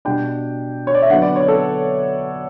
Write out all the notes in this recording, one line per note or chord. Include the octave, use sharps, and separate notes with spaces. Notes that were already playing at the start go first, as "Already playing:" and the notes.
B2 G3 D4 G5
C#5
D5
E5
D3 F#3 B3 F#5
D5
C#5
A4